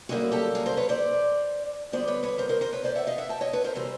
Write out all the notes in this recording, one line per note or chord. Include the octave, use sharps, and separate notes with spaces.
F#2 D3 G3 A#3 F#4 G#4
G4 A4
G#4 A#4
A#4 C5
B4 C#5
C5 D5
F2 D3 G3 B3 C5 D5
B4 C#5
B4 C#5
A#4 C5
A#4 C5
A#4 C5
B4 C#5
C5 D5
E5 F#5
D#5 F5
E5 F#5
G5 A5
C#5 D#5
B4 C#5
A#4 C5
C3 E3 G3 A#4 C5